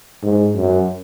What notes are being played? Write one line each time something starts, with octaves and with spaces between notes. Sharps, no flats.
G#2
F#2